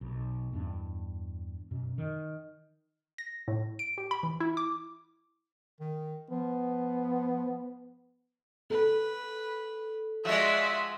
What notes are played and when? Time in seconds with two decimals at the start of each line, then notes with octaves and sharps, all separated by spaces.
0.01 B1
0.53 E2 G2 D4
1.71 F#2 B2
1.98 D#3
3.18 A#6
3.48 A2
3.79 D7
3.98 G4
4.11 B5
4.23 E3
4.40 E4
4.57 D6
5.80 D#3
6.30 F3 B3
8.70 A4 B4
10.25 F3 G#3 F#4 D5 E5